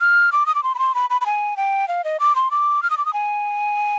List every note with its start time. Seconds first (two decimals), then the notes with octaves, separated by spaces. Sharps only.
0.01 F6
0.32 D6
0.46 D#6
0.55 D6
0.63 C6
0.75 B5
0.79 C6
0.95 B5
1.10 B5
1.21 B5
1.26 G#5
1.57 G5
1.88 F5
2.04 D#5
2.20 D6
2.35 C6
2.51 D6
2.83 F6
2.90 D#6
2.98 D6
3.05 D#6
3.13 G#5